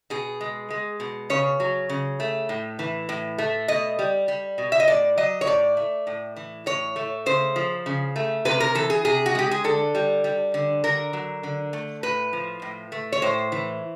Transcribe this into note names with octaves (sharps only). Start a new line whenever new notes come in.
B2 G#4
G#3
G#3
B2
C#3 C#5
F#3
C#3
A3
A2
E3
A2
A3
B2 D#5
G3
G3
B2
E5
D#5
A2 D5
F#3 D#5
C#5
A2 D5
A3
A2
E3
A2 C#5
A3
C#3 C5
F3
C#3
A3
C3 B4
A#4
E3 A4
G#4
C3 G#4
F#4
G#3 G4
G#4
D3 A4
G3
G3
D3
D3 A#4
F#3
D3
A3
A2 B4
F3
A2
A3
C#5
A2 C5
E3